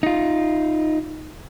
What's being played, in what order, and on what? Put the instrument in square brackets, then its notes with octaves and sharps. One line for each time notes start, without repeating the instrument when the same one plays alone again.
[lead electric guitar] D#4 F4